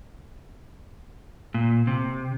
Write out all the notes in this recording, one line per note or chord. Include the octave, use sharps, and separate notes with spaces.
A#2
C3